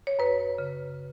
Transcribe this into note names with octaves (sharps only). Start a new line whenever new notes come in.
C#5
F#2 B4
C#3